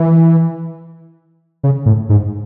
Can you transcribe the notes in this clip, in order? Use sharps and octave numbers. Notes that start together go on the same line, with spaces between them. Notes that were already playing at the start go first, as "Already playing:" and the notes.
Already playing: E3
C#3
A2
G#2